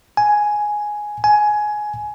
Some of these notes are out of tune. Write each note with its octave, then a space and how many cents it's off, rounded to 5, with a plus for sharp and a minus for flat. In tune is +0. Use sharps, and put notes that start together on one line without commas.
G#5 +5
G#5 +15